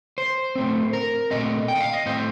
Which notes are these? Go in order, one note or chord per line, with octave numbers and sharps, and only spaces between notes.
C5
A2 A3 C4
A#4
A#2 A3 C4 D#5
G5
D#5
F5
D#5
A2 A3 C4 C5